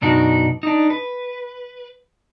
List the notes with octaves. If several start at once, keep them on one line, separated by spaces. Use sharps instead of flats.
F#2 B2 D4 D#4 F#4
D4 D#4
B4